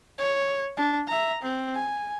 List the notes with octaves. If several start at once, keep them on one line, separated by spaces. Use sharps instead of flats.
C#5
D4
E5 A#5
C4
G#5